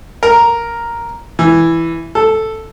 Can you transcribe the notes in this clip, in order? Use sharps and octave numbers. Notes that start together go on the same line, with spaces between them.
A#4
E3
A4